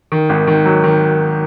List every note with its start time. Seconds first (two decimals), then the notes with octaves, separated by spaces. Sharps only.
0.12 D#3
0.29 G#1
0.47 D#3
0.65 F#3
0.84 D#3